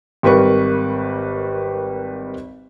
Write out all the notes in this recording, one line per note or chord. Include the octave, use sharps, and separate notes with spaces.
G#1 G3 A#4 B4 C#6